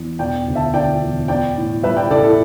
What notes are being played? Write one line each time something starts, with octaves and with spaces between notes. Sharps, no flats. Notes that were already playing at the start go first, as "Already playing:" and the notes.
Already playing: E2
E1 D5 G5
D2
E5 A5
D3 D5 G5
E1
B3 D5 G5
A2
G3 B4 E5
D5 G5
A1 A4 D5
E4 A4